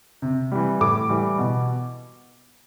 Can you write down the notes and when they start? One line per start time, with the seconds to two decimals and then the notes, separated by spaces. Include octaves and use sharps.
0.22 C3
0.52 E3 G3
0.81 A2 D6
1.09 E3 G3
1.38 B2